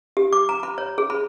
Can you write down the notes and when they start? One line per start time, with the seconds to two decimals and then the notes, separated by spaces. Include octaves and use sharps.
0.17 G4
0.33 D6
0.49 A#5
0.63 B5
0.78 C#5
0.98 G#4
1.10 B5